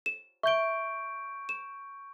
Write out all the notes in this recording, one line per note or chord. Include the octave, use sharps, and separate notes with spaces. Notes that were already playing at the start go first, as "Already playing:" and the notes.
E7
E5 C#6 G6 D7 G7
E7